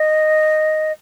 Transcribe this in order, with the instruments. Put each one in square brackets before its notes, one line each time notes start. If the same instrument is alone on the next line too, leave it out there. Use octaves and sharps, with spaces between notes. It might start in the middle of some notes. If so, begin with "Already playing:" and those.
Already playing: [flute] D#5